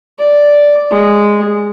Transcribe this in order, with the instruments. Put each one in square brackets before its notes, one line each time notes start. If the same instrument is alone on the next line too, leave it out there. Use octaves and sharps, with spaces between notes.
[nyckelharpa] D5
G#3